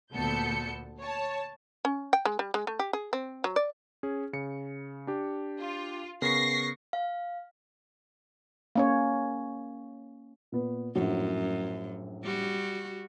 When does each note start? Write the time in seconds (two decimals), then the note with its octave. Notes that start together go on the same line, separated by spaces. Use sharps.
0.13 D2 A#2 B3 A4 G6 C#7
1.00 C#5 A5
1.85 C#4
2.13 G5
2.25 G#3
2.39 G3
2.54 G#3
2.67 A3
2.79 G4
2.93 G#4
3.13 C4
3.44 F#3
3.56 D5
4.03 C#4 G#4
4.33 C#3 C#7
5.07 D4 G4
5.57 F4
6.22 C#3 B3 A#4 C#6 A#6 C7
6.93 F5
8.76 A#3 C#4 C#5
10.52 A#2 B3
10.95 A#1 F#2 A2 F#3
12.23 G3 F#4